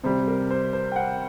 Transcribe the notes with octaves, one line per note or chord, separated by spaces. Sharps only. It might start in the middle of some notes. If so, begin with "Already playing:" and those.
C3 G3 C5
A#4
C5
C5
G5
F#5